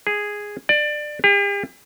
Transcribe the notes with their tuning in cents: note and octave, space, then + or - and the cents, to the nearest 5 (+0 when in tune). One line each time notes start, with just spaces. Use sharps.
G#4 -5
D5 +20
G4 +45